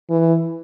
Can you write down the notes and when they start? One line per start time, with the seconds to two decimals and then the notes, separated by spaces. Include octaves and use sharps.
0.10 E3